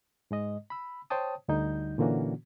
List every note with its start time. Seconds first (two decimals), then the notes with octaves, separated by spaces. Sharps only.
0.31 G#2 G#3 D#5
0.70 B5 E6
1.10 C5 C#5 G5 A5 D#6
1.48 D2 D3 G3 D#4 G6
1.98 A#2 D3 E3 A#3 C#4 F#4